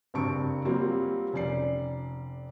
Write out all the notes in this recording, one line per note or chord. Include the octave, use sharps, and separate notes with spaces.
F#1 G2 C4 A5 C#6 D7
F#3 G3 A#3 C4 F4
F1 C#4 D5 C7